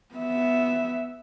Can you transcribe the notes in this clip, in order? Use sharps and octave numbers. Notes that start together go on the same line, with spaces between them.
B3 E5